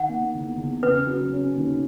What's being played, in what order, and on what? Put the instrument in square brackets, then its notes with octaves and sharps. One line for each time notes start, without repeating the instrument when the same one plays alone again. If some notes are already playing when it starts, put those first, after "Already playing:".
Already playing: [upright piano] D#3 [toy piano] F#5
[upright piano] A#3
E2
E2
[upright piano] C#3 [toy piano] B4
[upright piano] F#3
C#4
D#2